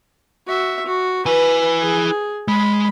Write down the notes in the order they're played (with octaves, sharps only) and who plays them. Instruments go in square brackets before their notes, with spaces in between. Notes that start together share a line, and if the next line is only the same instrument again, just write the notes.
[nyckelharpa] F#4 E5
F#4
[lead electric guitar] E4 G#5 [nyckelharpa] B4
[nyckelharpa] G#4
[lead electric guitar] G#3 [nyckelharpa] B5